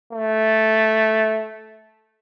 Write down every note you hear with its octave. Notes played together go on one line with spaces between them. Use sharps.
A3